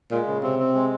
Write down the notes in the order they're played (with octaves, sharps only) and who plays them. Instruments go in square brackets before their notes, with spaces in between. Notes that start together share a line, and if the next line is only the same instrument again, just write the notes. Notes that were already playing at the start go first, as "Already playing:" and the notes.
[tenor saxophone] A#2 [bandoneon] G#3
[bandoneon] C#3
[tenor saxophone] C3 [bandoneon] C4
[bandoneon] C4
G#3